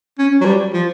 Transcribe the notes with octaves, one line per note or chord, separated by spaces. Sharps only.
C#4
F#3
G3
F3